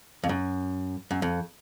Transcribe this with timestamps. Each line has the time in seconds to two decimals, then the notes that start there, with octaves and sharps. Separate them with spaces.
0.23 F2
0.29 F#2
1.11 F#2
1.22 F2